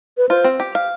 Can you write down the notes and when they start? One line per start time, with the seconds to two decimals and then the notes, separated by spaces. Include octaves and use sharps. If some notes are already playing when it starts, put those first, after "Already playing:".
0.18 B4
0.29 F4 C5
0.44 C4
0.60 G4
0.75 F5